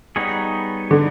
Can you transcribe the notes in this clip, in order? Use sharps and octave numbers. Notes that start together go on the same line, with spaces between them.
G3 B3 D#4 G#4 C#5
D3